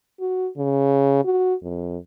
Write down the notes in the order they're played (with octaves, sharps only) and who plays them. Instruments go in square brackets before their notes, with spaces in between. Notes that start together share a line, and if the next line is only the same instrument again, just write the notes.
[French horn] F#4
C#3
F#4
F2